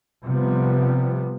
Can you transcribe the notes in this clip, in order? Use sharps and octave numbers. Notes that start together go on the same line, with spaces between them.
C3 F3 G3 B3